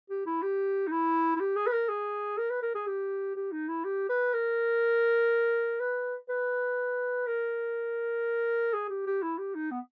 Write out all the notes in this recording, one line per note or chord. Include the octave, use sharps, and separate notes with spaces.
G4
E4
G4
D#4
E4
E4
G4
G#4
B4
A#4
G#4
A#4
B4
A#4
G#4
G4
G4
D#4
E4
G4
B4
A#4
B4
B4
A#4
G#4
G4
G4
E4
G4
D#4
B3